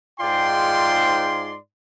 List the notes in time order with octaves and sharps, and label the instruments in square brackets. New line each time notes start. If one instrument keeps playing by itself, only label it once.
[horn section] G#2 D5 C6 [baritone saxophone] F4 [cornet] G5